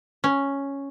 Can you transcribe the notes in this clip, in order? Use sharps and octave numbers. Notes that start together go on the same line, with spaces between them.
C#4